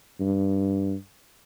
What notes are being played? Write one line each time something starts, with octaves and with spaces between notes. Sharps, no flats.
G2